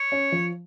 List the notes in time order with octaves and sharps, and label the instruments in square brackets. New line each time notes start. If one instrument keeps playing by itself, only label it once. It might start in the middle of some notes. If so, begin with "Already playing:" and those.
Already playing: [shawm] C#5
[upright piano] C#4
F3